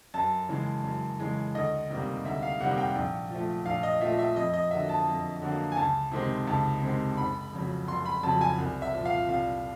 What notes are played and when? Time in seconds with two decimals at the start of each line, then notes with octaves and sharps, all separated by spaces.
0.14 F#2 A5
0.49 C#3 E3 G#3
0.84 F#2
1.20 C#3 E3 G#3
1.55 D2 D#5
1.90 C3 D#3 G3 A#3
2.25 D2 E5
2.43 F5
2.60 C3 D#3 G3 A#3 F#5
2.78 G5
2.95 A#1
3.30 A#2 F3 A3
3.66 A#1 F5
3.83 D#5
4.01 A#2 F3 A3 E5
4.19 E5
4.36 F2 D#5
4.54 D#5
4.71 D3 F#3 A#3 E5
4.89 A5
5.07 F2
5.42 D3 F#3 A#3
5.72 G#5
5.77 C#2 A5
6.12 C3 D#3 G#3 C4
6.47 C#2 A5
6.83 C3 D#3 G#3 C4
7.17 F#1 B5
7.53 F2 C#3 F#3
7.88 F#1 C6
8.05 B5
8.23 F2 C#3 F#3 A5
8.41 G#5
8.58 C2
8.82 E5
8.94 A#2 F3
9.05 F5
9.29 C2 F5